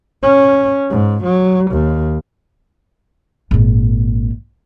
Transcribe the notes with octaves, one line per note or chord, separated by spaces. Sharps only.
C#4
G#2
F#3
D#2
G#1 A#2